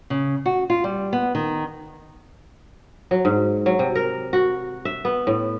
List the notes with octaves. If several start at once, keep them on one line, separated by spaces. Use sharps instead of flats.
C#3
F#4
F4
G3
B3
D#3
F#3
G#2
F#3
C3
A#4
F#4
E5
B3
A2